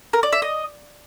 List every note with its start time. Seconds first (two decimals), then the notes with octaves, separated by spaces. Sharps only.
0.13 A#4
0.23 D5
0.32 E5
0.42 D#5